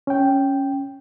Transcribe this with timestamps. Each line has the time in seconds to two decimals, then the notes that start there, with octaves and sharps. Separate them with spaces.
0.07 C#4 G5